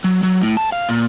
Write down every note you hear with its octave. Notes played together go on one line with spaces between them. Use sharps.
F#3
F#3
A2
A5
F5
A#2